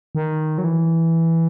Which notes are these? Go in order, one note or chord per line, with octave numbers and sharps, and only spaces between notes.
D#3
F#3
E3